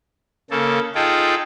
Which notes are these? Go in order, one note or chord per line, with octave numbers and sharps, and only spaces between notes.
C#3 A#3 A4
D#4 F4 G#4 A4 G5